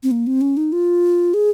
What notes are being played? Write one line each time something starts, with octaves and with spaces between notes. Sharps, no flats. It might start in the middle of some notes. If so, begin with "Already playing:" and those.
C4
A#3
C4
C#4
D#4
F4
G#4